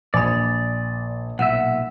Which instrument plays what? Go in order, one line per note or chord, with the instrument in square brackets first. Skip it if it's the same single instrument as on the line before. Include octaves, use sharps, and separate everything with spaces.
[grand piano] A#1 G#5 D#6 [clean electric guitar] D5 [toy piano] D#5 B5
[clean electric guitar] B1 A#2 E5 [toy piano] F#5